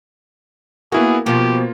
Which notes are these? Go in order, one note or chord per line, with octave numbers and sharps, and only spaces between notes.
A#3 B3 E4 F#4 G#4
B2 F3 A#3 F4 G4